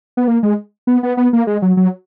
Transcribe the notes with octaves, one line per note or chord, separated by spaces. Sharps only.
B3
A#3
G#3
B3
B3
B3
A#3
G#3
F#3
F#3